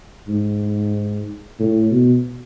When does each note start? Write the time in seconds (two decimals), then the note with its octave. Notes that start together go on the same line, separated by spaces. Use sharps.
0.28 G#2
1.59 A2
1.91 B2